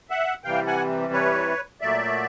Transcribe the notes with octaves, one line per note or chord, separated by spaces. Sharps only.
E5 F#5
C3 E3 G3 F5 G5
F#5 G#5
B4 C#5
A#2 F#3 A3 D5 E5